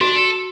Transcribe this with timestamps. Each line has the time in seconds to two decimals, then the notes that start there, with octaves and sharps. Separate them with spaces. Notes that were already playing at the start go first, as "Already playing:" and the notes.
0.01 D4 F#4
0.16 A4